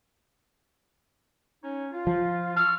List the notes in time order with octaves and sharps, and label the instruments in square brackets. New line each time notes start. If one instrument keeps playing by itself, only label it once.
[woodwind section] C#4 D#4 C#5
F4
[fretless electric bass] F3
[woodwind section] A5 C#6 E6 [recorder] F6